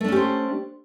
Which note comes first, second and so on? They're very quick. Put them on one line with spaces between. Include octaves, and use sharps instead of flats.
A3 D4 C#4 G4 C5